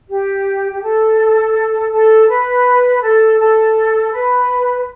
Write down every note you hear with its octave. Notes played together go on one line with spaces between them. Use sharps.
G4
G4
A4
A4
B4
A4
A4
B4